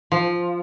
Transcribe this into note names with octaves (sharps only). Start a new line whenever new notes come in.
F3